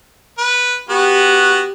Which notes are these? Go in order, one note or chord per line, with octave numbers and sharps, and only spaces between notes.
B4
B3 F#4 G4